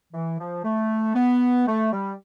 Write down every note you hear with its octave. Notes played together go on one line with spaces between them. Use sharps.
E3
F3
A3
B3
A3
G3